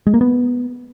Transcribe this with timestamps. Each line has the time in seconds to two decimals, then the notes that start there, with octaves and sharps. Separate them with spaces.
0.07 G#3
0.14 A#3
0.21 B3